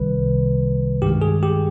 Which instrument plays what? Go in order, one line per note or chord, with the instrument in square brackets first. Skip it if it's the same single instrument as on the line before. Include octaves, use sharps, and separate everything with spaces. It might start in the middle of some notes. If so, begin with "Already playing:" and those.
Already playing: [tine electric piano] C2 C3 D#3 G3 B4
G2 D#3 G#3 G4
G#4
G4